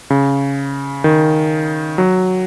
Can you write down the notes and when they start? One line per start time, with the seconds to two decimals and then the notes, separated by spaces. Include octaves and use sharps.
0.10 C#3
1.04 D#3
1.98 F#3